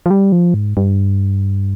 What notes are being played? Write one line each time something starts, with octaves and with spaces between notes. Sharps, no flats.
F3
G3
F3
G#2
G2